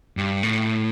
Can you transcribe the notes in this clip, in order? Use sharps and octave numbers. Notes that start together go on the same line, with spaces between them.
G2
A2